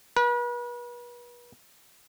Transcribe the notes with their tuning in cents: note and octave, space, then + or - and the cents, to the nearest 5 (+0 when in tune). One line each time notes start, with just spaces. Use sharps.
B4 -40